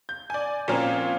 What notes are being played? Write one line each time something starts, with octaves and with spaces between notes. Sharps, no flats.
G6
D5 G#5
A#2 F3 C4 C#4 F4 A#4